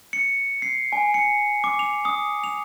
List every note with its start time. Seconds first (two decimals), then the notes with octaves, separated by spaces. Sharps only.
0.13 C#7
0.62 C7
0.92 G#5
1.14 C#7
1.64 D6
1.79 F7
2.05 D#6
2.44 F7